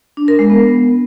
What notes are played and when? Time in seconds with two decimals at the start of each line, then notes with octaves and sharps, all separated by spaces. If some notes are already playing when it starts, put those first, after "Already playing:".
0.17 D4
0.28 A#4
0.39 G#3
0.50 B3